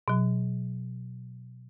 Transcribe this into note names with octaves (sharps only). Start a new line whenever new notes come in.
B2 F#3